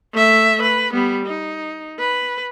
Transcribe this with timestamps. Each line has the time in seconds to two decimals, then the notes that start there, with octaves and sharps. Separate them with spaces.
0.13 A3 E5
0.62 B4
0.93 G3 B3
1.26 D#4
1.99 B4